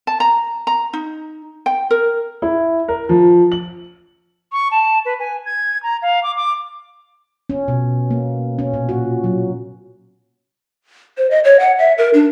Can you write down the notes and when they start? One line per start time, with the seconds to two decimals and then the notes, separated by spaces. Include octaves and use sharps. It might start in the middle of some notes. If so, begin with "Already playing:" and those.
0.07 A5
0.20 A#5
0.67 A#5
0.93 D#4
1.66 G5
1.91 A#4
2.42 E4
2.88 A#4
3.09 F3
3.52 F#7
4.52 C#6
4.71 A5
5.05 B4
5.20 G#5
5.46 G#6
5.83 A#5
6.02 F5
6.23 D6
6.37 D6
7.50 C#4
7.68 B2
8.11 A#3
8.59 C#4
8.74 A#2
8.89 F#4
9.24 F#3
11.18 C5
11.31 D#5
11.44 C#5
11.60 F#5
11.79 E5
11.98 A#4
12.14 D4